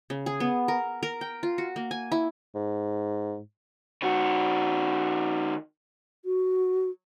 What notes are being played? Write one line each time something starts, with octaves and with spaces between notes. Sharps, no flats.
C#3
G#4
B3
A#4
A#4
G5
F4
F#4
A#3
G#5
E4
G#2
D#3 F#4
F#4